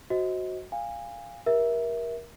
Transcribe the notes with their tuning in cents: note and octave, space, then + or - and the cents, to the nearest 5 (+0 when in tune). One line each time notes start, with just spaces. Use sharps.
F#4 +0 C5 +10 D#5 +25
F5 +0 G#5 -25
G4 +0 A#4 +25 E5 -10